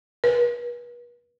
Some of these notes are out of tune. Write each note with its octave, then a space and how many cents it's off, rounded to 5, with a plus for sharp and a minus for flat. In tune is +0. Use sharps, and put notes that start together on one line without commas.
B4 -40